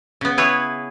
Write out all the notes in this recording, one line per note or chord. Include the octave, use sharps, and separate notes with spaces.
C#3 B3
E4 G#4 B4 C#5